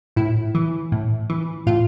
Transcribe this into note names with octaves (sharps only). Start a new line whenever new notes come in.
A2 E4
E3
A2
E3
A2 F4